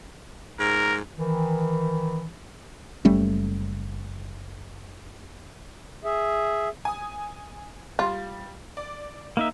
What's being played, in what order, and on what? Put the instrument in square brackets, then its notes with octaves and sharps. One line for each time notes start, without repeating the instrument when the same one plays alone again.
[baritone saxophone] G#2 [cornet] A#4
[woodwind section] D#3 E3
[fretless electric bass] F#1 G3 A3 C#4
[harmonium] G#4 E5
[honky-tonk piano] G#5 D#6
[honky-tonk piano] G3 [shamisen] F4
[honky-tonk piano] D5
[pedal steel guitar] A#3 D#4 E5